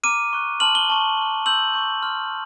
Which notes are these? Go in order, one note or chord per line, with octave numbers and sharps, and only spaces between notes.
A#5 D6 F6 D#7
C#6 F#6
A5 C6 F6 F#7
G7
A5 C#6 F6
C#6 F6
C6 E6 G6 F#7
C#6 E6 G6
C6 F6